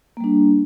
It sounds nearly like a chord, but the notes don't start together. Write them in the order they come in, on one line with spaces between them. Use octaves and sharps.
A#3 G3 D4